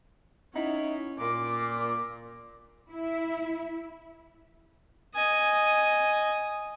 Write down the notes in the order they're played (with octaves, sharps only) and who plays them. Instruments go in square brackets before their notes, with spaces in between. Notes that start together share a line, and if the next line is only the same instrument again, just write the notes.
[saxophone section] B3 D#4 E4 [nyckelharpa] C#4
[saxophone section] A#2 [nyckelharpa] D6
[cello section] E4
[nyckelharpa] D#5 G#5